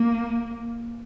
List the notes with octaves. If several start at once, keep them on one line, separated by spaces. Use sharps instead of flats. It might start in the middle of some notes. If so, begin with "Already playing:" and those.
Already playing: A#3